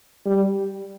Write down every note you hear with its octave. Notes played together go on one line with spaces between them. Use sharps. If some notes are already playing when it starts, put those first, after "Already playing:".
G3